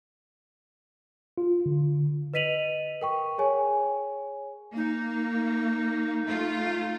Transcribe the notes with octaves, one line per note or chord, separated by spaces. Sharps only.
F4
D3
B4 D#5 B6 D#7 F7 F#7
A#4 G5 C#6
G#4 C#5 G#5
A#3 D#4
A3 F4